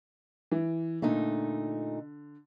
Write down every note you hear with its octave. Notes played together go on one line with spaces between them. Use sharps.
E3
A#2 D3 A3 D#4